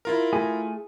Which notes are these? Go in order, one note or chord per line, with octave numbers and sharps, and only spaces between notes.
E4 F4 A#4
A3 G#4 G#5